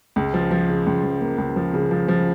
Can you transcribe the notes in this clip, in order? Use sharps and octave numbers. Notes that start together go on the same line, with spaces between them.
C#2
F3
F3
C#3
C#2
F3
A#3
C#2
F3
C#3
F3
F3